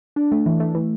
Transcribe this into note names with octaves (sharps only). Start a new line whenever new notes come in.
D4
A3
E3
A3
E3